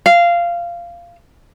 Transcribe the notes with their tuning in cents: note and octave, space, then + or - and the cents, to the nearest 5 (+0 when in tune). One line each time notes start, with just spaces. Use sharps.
F5 -15